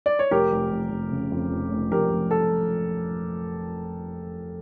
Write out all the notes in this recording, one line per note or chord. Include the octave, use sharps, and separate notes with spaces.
D5
C#5
F1 G4 A#4
F1
F1
F1
C#3
F2
F1
F1
F1 G4 A#4
F1
A4